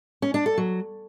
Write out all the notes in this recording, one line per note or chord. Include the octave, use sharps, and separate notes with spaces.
C#4
D4
A4
F#3